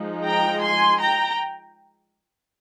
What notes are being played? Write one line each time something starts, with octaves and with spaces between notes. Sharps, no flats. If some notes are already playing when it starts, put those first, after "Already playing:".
Already playing: F3 G#3 D#4
G5 A#5
G#5 C6
G5 A#5